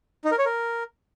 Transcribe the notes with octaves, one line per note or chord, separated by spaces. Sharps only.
D#4
A#4
C#5
A#4